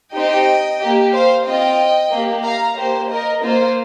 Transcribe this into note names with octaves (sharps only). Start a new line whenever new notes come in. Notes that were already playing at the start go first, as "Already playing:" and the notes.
C4 D#4 G4 D#5 G5
A#3 G4
C5 F5
C4 F4 D#5 G5
A#3
G4
F5 A#5
A#3 G4 C5
A#4 D#5
A#3 F4 C5